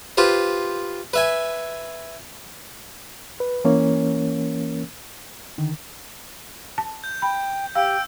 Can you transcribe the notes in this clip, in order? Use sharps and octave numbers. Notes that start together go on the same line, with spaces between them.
F4 G4 B4 C5
B4 E5 G#5
B4
E3 A#3 C#4 A#4 C#5
D3 D#3
A5
G6
G5 B5
G4 F5 G5 E6